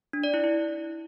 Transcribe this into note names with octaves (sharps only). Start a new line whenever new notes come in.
D4
D5
E4
E4